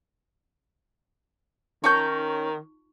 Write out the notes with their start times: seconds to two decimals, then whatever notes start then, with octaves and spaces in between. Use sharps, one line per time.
1.84 D#3 C#4 D#4 F4 A#5 C#6 G6